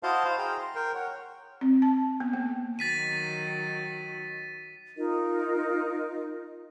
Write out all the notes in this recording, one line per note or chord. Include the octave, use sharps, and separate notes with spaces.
E4 F#4 C5 D#5 F5 A5
C5 F5
G#4 G5 A#5
C6
A#4 G5
C#5 F#5
C4
A5
B3
A#3
D#3 F#3 A6 B6 D#7
D#4 F4 A#4 D#5